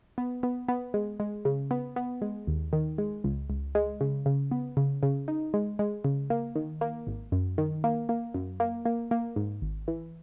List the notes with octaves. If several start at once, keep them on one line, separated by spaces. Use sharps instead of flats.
B3
B3
B3
G#3
G#3
C#3
B3
B3
G#3
D#2
D#3
G#3
C#2
C#2
G#3
C#3
C#3
B3
C#3
C#3
D#4
G#3
G#3
C#3
A#3
D#3
A#3
G#1
F#2
D#3
A#3
A#3
F#2
A#3
A#3
A#3
G#2
G#1
E3